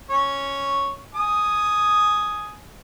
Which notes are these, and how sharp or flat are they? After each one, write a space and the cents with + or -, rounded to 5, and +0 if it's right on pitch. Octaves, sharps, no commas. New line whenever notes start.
C#4 +0 C#5 +0
G#5 +10 D#6 +0